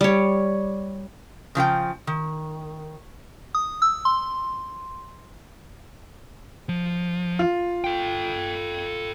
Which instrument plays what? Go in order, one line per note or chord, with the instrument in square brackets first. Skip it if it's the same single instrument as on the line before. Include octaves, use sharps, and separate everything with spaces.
[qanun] G3 C#5
[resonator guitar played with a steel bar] C#3 F3 F4 G5
D#3
[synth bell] D#6
E6
C6
[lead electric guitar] F3
[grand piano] F4
[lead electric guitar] A4 G5